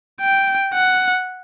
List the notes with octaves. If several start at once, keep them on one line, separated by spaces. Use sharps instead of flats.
G5
F#5